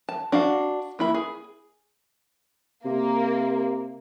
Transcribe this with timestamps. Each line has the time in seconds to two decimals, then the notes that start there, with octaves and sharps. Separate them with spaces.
0.09 A5
0.32 D4 F#4 F5
0.99 A#3 E4 B5
1.14 G#4
2.85 C3 A#3